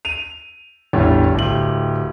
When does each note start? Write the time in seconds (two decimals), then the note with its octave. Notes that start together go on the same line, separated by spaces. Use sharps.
0.05 D#7 F7
0.93 A1 E2 D3 G3 C#5
1.35 D1 G4 F#7